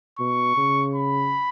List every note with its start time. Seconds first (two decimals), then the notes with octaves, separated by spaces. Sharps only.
0.19 B2 C#6
0.57 C#3
0.95 B5